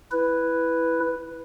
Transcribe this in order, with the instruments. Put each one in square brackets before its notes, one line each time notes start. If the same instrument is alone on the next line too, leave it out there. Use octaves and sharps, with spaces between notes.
[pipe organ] E4 B4